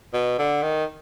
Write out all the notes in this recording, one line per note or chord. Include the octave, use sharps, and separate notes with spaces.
B2
D3
D#3